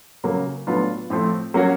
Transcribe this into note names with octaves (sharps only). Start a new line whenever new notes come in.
C#3 F#3 A#3
A2 F#3 B3 D4 F4
A2 F3 A3 C4
F#3 A#3 C#4 F#4